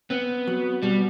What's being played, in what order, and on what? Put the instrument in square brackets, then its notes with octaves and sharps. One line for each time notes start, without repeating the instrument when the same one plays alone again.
[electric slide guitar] B3 [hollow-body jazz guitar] C4
[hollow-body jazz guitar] F#3
[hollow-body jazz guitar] B2 [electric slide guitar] G3